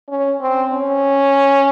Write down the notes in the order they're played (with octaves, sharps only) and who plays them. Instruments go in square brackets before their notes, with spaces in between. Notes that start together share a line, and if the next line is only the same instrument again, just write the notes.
[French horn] C#4
C4
C#4